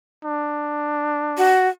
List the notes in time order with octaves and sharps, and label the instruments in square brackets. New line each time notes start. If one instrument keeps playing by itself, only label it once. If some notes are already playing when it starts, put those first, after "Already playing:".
[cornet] D4
[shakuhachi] F#4